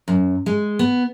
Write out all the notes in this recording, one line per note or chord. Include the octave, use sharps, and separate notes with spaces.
F#2
G#3
B3